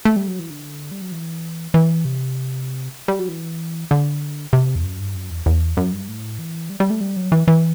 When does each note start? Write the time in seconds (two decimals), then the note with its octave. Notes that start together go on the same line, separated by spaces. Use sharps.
0.05 A3
0.16 G3
0.28 F#3
0.39 E3
0.50 D3
0.91 G3
1.02 F#3
1.12 E3
1.74 E3
2.05 C3
3.08 G3
3.19 F#3
3.29 E3
3.91 D3
4.53 C3
4.76 E2
4.84 F#2
4.99 G2
5.15 F#2
5.30 E2
5.46 E2
5.77 F#2
5.93 G2
6.08 A2
6.39 E3
6.70 G3
6.80 G3
6.90 A3
7.01 G3
7.16 F#3
7.32 E3
7.48 E3